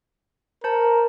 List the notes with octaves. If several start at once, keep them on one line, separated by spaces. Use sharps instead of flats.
A#4 C5 A5